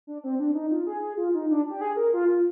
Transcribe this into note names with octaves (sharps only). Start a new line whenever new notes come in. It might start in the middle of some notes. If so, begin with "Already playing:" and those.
D4
C4
D4
D#4
F4
G#4
G#4
F4
D#4
D4
G4
G#4
A#4
F4
F4